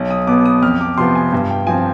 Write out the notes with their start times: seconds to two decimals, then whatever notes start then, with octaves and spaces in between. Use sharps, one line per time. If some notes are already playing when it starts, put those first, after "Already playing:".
Already playing: B1
0.10 D#6
0.27 B2 B3 D6
0.45 D#6
0.62 F2 F6
0.81 D6
0.98 C3 F3 B3 C6
1.15 G#5
1.33 G2
1.50 G5
1.67 F3 C4 G#5